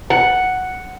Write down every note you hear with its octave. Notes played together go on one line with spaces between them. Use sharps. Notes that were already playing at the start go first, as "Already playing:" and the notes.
F#5